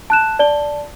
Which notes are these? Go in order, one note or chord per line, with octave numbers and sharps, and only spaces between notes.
A5 F#6 E7
D5 A5 G7